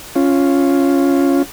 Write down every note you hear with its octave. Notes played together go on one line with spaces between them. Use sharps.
C#4 F4